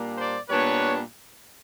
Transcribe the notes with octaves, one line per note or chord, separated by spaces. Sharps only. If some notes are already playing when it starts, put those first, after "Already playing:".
Already playing: A#2 G3 A#3 D4
C5 D5
A#2 G3 B3 D4 B4 C#5